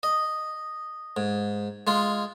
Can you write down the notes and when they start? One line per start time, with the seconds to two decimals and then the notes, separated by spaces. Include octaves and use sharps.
0.03 D#5
1.17 G#2
1.87 G#3 F4